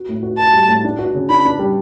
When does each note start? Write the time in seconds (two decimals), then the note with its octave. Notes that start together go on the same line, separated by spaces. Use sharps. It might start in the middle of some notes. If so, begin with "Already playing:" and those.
Already playing: F#4
0.09 A2
0.23 F#4
0.39 F#4 A5
0.53 G3
0.68 A2
0.84 D4
0.99 F#4
1.15 C#3
1.30 D4 B5
1.45 D4
1.59 G3